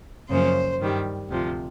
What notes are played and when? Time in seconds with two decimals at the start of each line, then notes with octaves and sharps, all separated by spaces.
0.29 F#2 C#3 F3 A#3 C#4 C5
0.79 G2 D#3 G3
1.30 D2 C3 F3